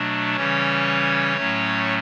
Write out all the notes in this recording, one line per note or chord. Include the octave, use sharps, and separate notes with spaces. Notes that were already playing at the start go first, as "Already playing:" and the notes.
Already playing: B2 F#3 A3 D4
C#3 E3 G3 C#4 C#5
A2 F#3 A3 C#4